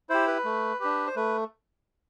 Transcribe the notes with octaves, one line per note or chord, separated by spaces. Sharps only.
E4 G4 C5
B4
A3
D4 G4
C5
A3 B4